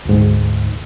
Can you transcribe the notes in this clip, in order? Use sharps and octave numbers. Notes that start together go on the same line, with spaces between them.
D2 G#2